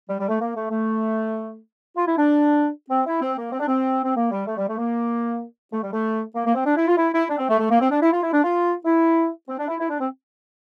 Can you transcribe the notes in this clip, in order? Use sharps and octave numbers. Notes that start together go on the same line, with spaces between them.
G3
G3
A3
A#3
A3
A3
F4
E4
D4
C4
E4
C4
A#3
C4
D4
C4
C4
A#3
G3
A3
G3
A3
A#3
A3
G3
A3
A#3
A#3
C4
D4
E4
F4
E4
E4
D4
C4
A3
A3
A#3
C4
D4
E4
F4
E4
D4
F4
E4
C4
D4
E4
E4
D4
C4